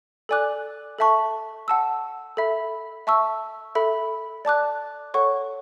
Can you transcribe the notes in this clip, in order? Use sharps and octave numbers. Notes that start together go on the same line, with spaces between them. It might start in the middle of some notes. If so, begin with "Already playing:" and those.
A4 D5 G#5 D6 F#6
A4 E5 A5 C#6
F#5 A5 E6
A4 E5 B5
E5 A5 C#6 E6
A4 E5 B5
D5 A5 D6 F#6
A4 C#5 F#5 C#6